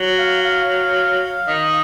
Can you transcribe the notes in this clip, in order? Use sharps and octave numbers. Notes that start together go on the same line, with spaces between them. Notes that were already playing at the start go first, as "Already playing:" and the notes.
Already playing: F#3
F5
F5
D#3 D#5